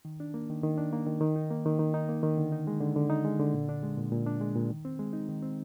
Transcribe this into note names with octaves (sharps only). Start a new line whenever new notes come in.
D#3
D4
A#3
D#3
D#3
D4
A#3
D#3
D#3
D#4
A#3
D#3
D#3
D#4
A#3
D#3
D3
D#4
G#3
D3
D3
D#4
G#3
D3
A#2
D4
G#3
A#2
A#2
D4
G#3
A#2
D#3
C4
G#3
D#4
D#3
C4